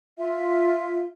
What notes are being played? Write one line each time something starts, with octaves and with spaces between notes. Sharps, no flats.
F4 E5